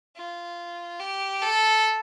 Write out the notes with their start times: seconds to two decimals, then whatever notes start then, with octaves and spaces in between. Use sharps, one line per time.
0.16 F4
1.00 G4
1.42 A4